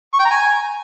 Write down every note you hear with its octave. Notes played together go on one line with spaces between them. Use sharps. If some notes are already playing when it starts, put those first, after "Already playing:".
C#6
G5
A#5
G#5